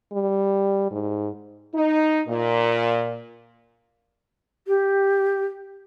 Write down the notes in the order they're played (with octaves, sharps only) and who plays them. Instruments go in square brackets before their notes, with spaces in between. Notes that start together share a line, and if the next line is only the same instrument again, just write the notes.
[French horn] G3
G#2
[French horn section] D#4
A#2
[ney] G4